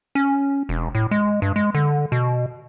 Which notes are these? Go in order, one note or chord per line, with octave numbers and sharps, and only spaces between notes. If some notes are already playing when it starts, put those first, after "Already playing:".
C#4
E1
A2
G#3
G2
G#3
D3
B2